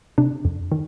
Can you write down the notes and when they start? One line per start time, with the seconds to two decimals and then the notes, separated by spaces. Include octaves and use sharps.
0.18 C3 D4
0.45 F2
0.72 D#3